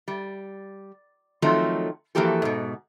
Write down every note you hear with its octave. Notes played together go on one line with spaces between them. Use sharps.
G3
D#3 F3 F#3 A3 C4 D#4
E3 F3 A#3 F#4 G4 A4
G#2 B2